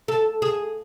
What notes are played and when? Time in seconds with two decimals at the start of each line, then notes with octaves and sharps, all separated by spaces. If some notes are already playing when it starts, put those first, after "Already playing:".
0.08 A4
0.42 G#4